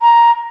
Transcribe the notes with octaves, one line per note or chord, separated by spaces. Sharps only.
A#5